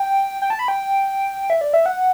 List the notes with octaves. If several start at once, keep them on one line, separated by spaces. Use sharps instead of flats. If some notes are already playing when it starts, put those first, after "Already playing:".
Already playing: G5
G5
A5
B5
G5
E5
D5
E5
F#5